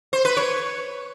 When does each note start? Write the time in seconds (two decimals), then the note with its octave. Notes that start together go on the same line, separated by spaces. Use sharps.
0.13 C5
0.25 B4
0.37 C#5